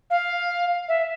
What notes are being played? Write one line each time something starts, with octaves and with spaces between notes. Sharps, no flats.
F5
E5